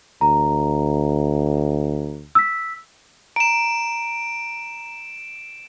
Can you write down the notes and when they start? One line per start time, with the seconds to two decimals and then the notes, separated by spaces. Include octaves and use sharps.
0.21 D2 A#5
2.35 E6 B6
3.36 A#5 D7 E7